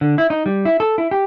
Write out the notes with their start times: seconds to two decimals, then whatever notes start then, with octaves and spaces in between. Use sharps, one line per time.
0.01 D3
0.18 E4
0.30 D#4
0.46 G3
0.65 E4
0.80 A4
0.98 E4
1.11 G4